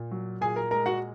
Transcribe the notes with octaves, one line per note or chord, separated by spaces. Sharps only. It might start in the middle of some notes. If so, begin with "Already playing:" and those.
Already playing: A#2
F#3
A#2 G#4 G#5
A#4 A#5
G#3 A#4 A#5
F#4 F#5